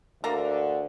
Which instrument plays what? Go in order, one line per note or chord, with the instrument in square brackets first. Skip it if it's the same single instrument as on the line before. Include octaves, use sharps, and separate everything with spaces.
[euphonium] D2 [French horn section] D3 [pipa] A#3 A4 A#5